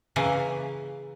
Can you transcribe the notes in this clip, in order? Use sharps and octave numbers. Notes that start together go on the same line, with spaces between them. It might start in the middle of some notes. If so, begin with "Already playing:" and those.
C#3 E3 A#3